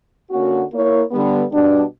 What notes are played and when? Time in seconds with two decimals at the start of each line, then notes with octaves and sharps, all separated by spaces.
0.31 D3 A#3 C#4 F#4
0.71 A#3 E4 A#4 C#5
1.11 D3 G3 B3
1.52 B2 G3 B3 D4